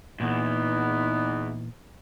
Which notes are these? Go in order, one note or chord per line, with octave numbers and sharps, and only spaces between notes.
E2 A#2 E3 B3 D#4